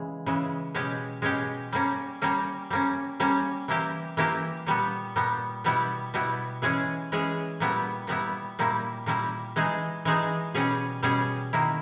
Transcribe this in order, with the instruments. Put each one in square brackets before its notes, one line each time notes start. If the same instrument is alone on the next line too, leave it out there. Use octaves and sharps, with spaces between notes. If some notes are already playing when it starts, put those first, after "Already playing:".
Already playing: [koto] C#3 E3 G#3
C#3 E3 G#3
B2 G#3 C#4 G4
B2 G#3 C#4 G4
G3 A#3 C#4
G3 A#3 C#4
G3 A#3 C#4
G3 A#3 C#4
E3 A#3 E4 G4
E3 A#3 E4 G4
A#2 G3 B3
A#2 G3 B3
B2 G3 B3 E4
B2 G3 B3 E4
E3 G#3 C#4 G#4
E3 G#3 C#4 G#4
A#2 G3 B3 E4
A#2 G3 B3 E4
A#2 G3 A#3 E4
A#2 G3 A#3 E4
E3 G#3 D#4 G#4
E3 G#3 D#4 G#4
B2 G3 C#4 G#4
B2 G3 C#4 G#4
D#3 A#3 E4